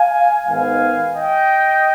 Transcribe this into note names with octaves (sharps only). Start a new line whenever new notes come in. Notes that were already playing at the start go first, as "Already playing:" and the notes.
Already playing: F5 G#5
G#2 D#3 B3 F5 G#5
D#5 G5